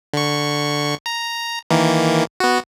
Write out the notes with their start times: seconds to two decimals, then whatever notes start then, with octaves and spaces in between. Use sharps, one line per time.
0.13 D3 C#6
1.06 A#5
1.70 D#3 E3 A#3
2.40 B3 F#4